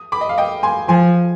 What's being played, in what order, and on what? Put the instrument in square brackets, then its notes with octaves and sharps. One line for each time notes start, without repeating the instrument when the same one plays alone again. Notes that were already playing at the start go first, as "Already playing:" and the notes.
Already playing: [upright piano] D#6
B5 D6
D#5
F5
D#5 G5
G#5 C6
[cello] F3 [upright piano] G#5 C6